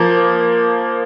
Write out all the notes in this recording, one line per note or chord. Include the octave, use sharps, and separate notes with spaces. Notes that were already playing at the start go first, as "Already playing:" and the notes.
Already playing: F3 A#3